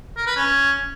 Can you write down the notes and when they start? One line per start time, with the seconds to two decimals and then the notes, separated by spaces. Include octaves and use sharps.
0.17 A#4
0.27 B4
0.36 C#4